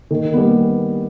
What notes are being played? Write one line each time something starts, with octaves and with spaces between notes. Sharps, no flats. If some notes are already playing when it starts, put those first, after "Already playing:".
D#3
G3 B3